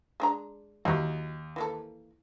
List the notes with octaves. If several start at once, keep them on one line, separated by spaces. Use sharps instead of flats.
G#3 D4 A#5
D#2 F#3 E4
E3 A#3 A4